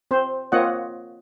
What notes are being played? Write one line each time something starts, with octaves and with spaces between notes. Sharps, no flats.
C4 C5
A#3 C4 F4 C#5 D#5 F#5